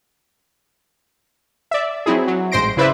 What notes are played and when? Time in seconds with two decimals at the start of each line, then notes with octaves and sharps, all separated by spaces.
1.71 D5 E5
2.06 F#3 C4 E4 G#4
2.27 F#3
2.52 A1 G#2 C5 C6 A#6 D7
2.77 C#3 E4 B4 C5 D5 E5